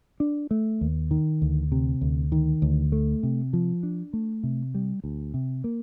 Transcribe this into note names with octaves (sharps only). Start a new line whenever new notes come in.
D4
A3
D#2
D#3
D2
C3
D2
D#3
D2
A3
C3
F3
D4
A3
C3
G3
D2
C3
A#3